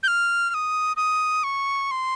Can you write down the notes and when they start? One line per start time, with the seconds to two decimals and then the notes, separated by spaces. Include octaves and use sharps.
0.03 G6
0.08 F6
0.50 F6
0.54 D#6
0.97 D#6
1.44 C#6
1.91 C6